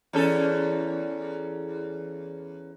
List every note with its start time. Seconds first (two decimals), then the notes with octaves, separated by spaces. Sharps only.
0.13 E2 C#4 A4